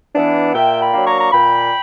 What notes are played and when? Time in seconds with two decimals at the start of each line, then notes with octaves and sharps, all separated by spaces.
0.15 E3 B3 D4
0.54 A#2 E5 G5
0.81 G5 B5
0.94 F#3 A#3 D4
1.06 A#5 C#6
1.21 A#5
1.32 A#2 G5 B5